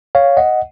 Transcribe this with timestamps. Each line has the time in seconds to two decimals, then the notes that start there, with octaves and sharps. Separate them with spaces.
0.15 C#5 F5
0.37 D#5 F#5